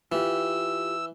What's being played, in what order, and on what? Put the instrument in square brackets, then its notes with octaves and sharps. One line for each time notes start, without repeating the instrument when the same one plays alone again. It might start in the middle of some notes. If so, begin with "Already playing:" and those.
[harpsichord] E3 [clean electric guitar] F4 G4 [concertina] E6